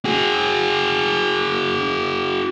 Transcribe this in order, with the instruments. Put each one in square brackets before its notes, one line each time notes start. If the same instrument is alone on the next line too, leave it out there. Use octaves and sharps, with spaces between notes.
[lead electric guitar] F#4 G#4